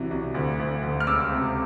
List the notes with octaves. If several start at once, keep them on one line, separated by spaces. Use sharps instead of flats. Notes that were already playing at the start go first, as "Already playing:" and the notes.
Already playing: C2 E3 F#3
C2
D2
D2
D2
F6
C#2 D6 E6
C3